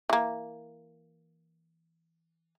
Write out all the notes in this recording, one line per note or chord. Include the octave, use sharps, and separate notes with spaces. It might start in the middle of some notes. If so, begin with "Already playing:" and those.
E3 A#3